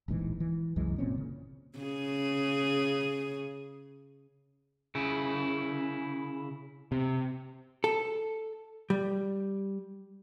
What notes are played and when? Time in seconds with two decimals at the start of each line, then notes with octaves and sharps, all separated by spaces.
0.08 D1 A#1 G#2 E3
0.40 E3
0.76 C2 F#2 E3 G#3
0.98 G1 A#2 C4 C#4
1.18 C#3
1.79 C#3 G#4
4.95 C#3 E4
6.92 C3
7.84 A4
8.90 G3